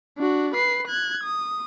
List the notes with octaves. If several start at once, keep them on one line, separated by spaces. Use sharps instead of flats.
D4 F#4
B4 C7
F#6 G#6
D#6